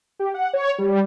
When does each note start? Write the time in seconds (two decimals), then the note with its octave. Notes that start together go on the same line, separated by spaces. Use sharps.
0.19 G4
0.34 F#5
0.53 C#5
0.78 G3